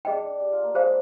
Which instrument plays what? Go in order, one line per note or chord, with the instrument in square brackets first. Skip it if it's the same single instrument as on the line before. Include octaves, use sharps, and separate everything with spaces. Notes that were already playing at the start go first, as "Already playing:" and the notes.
[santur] D4 [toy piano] G#4 D#5 G5
[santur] D4
G4
F4
A#3
[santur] G#3 [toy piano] G#4 C5 F5